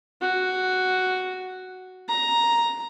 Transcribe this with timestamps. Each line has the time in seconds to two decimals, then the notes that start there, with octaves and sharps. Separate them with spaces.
0.22 F#4
2.08 A#5